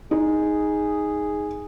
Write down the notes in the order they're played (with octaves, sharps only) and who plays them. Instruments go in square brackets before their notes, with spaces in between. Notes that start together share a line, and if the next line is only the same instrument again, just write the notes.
[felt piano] D#4 [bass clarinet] G#4